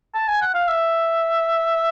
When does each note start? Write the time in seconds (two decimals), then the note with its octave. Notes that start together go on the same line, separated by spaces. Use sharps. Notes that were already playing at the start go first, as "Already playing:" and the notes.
0.14 A5
0.28 G#5
0.41 F#5
0.54 F5
0.68 E5